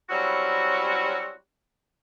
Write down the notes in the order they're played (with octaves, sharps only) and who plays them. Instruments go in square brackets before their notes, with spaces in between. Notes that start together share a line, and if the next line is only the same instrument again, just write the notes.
[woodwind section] F#3 G3 C4 C#4 E4 F#4